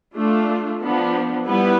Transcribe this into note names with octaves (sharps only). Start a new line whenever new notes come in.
A3 D4 F4
F3 B3 D4
G3 B3 E4 B4